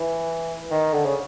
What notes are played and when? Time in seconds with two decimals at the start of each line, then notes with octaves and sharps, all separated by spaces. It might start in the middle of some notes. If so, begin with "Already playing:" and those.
Already playing: E3
0.71 D#3
0.93 D3
1.05 C#3